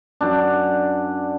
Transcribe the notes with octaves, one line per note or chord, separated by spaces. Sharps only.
F#2 D4